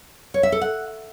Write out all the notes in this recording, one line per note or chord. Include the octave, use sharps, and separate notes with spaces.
C#5
E5
A4
F#5